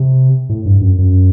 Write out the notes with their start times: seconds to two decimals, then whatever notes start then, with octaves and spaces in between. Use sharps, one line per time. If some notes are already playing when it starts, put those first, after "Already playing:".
Already playing: C3
0.49 A2
0.66 G2
0.81 F#2
0.98 F#2